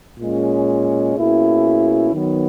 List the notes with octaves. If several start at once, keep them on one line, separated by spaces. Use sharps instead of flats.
A#2 G#3 C#4
B2 A#3 C#4 E4 G#4
D#3 F#3 B3